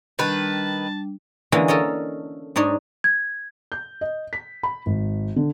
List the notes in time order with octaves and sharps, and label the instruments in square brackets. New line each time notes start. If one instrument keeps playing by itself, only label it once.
[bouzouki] D#3 B4 [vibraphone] G3 D4 [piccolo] A5
[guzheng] D3 E3 G#3 A#3 C#4
A4 A#4 C#5 D#5
G#2 D4 D#4 C#5
[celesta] G#6
[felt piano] G6
D#5
B6
B5
G#1
D3